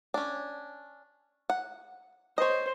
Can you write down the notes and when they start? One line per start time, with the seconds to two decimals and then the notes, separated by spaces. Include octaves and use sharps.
0.14 C#4 D4
1.50 F#5
2.38 C5 C#5 D#5